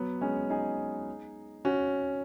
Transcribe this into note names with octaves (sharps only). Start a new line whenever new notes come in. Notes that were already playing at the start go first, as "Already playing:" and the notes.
Already playing: F#3 B3
G#3 C#4
D#4 G#4
C#4 F#4